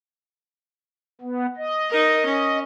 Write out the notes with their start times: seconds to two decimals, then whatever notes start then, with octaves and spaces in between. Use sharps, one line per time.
1.21 B3
1.57 D#5
1.90 D#4 A#4
2.25 C#4